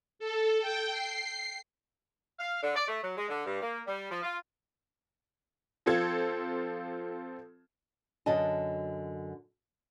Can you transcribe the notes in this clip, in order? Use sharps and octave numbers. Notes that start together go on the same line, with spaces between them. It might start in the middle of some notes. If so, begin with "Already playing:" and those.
A4
G5
C7
F5
D3
D5
A3
F#3
G#3
D3
G2
A#3
G3
F3
F4
F3 C4 F4 A4 G#6
F#2 D3 F#4 D#5 A5